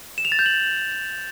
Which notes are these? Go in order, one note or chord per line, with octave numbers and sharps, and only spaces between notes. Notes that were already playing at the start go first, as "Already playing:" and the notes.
E7
F7
A6
G6
F#7